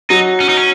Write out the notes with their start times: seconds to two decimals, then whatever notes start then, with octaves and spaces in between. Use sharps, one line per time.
0.10 F#3 D#4
0.40 C#4
0.49 D#4
0.57 C#4